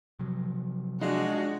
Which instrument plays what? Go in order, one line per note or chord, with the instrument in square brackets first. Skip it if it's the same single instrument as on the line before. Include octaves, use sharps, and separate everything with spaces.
[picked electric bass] C3 F3 F#3
[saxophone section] G#3 F4 [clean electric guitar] D4 D#4 [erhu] F#4